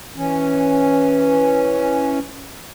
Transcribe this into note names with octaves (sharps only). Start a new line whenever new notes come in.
E3 C#4